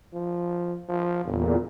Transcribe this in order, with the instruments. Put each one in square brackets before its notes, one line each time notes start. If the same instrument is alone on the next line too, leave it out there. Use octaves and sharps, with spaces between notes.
[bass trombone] F3
F3
[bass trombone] G1 [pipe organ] E2 A#2